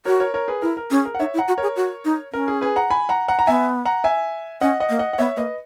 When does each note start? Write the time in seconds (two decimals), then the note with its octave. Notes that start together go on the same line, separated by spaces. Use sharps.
0.05 F#4 A#4 C#5
0.20 A#4 C#5
0.34 A#4 C#5
0.48 G#4 B4
0.62 E4 A#4
0.77 A#4
0.91 C#4 G#4
1.05 A#4
1.15 F#5
1.20 D#4 C#5 E5
1.34 E4
1.38 F#5 A#5
1.48 F#4
1.58 G#4 A#4 C#5
1.76 F#4
2.05 D#4
2.33 C#4 A#4
2.48 G#4
2.61 G#4 B4
2.76 F#5 A#5
2.90 G#5 B5
3.09 F#5 A#5
3.28 F#5 A#5
3.39 A#5
3.47 B3 E5 G#5
3.85 F#5 A#5
4.04 E5 G#5
4.61 C#4 D#5 F#5
4.80 D#5 F#5
4.89 A#3
4.99 D#5 F#5
5.13 F#5
5.18 B3 C#5 E5
5.37 A#3 B4 D#5